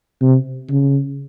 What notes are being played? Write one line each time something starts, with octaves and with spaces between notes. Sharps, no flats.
C3
C#3